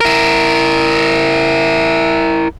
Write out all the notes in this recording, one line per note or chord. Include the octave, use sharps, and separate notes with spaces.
E4 A#4